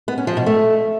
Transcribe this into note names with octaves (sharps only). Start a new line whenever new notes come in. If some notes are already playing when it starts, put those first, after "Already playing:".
B3
C#4
F3
B2
A3